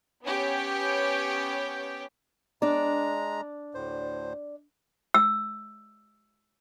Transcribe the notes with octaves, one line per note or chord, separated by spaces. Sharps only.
B3 C#4 G4 C#5 G5
G#3 D4 D5 A#5
D2 A2 C5
E6